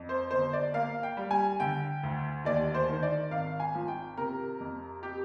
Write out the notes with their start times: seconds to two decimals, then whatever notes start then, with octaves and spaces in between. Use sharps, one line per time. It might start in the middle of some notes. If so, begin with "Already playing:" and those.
Already playing: F2
0.09 C5
0.31 G1 C5
0.53 D5
0.73 A#3 F5
1.03 G5
1.17 G3
1.31 G#5
1.60 D3 G5
2.03 D2
2.45 D#2 D5
2.74 C5
2.89 D#3
3.03 D5
3.31 G#1 F5
3.60 G#5
3.75 F3
3.88 G5
4.17 C3 A#4
4.60 F2
5.03 G4